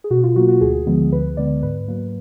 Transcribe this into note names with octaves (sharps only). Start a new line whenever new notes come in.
G#4
B2 F#4
F4
F#3 A#3 F#4
F#4
D2 G#4
D3 F3 G#3 B3
D2 B4
D3 G#3 B3 D5
G#2 B4
F#3 A#3